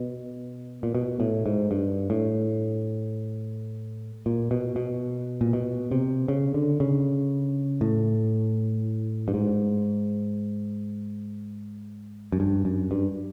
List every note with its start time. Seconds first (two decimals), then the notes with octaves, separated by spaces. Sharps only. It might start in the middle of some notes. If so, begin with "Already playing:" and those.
Already playing: B2
0.83 A#2
0.95 B2
1.20 A2
1.46 G#2
1.71 G2
2.10 A2
4.26 A#2
4.51 B2
4.76 B2
5.41 A#2
5.53 B2
5.91 C3
6.28 C#3
6.54 D3
6.80 C#3
7.81 A2
9.28 G2
9.34 G#2
12.32 F#2
12.40 G2
12.65 F#2
12.91 G2